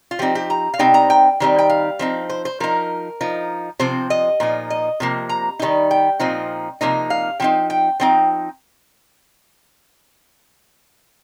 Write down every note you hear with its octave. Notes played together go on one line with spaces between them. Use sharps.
F4
F3 C4 D#4 G4
G4
A#5
F5
C3 G3 C4 D#4 G5
A#5
G5
D#3 G3 C4 D#4
G5
F5
F3 C4 D#4
C5
C5
F3 D#4 A#4
F3 D#4
C3 F3 C4 C5
D#5
A#2 F3 D#4
D#5
C3 F3 A#3
A#5
D#3 G3 D#4
G5
A#2 F3 C4 D#4
C3 F3 A#3 D#4
F5
F3 C4 D#4 G5
G5
F3 C4 D#4 G5